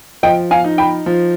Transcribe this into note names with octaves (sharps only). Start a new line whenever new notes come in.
F3 D#5 G5
F5 G#5
D#4
G5 B5
F3